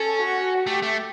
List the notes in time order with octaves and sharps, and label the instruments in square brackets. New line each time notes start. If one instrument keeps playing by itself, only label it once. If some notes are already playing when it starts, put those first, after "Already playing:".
Already playing: [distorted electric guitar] C#4 [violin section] A4
[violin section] F#4
[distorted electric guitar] A3 [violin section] G4
[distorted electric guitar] A3